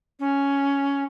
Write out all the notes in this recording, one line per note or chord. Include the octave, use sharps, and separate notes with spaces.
C#4